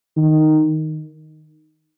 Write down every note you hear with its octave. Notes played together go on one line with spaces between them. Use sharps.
D#3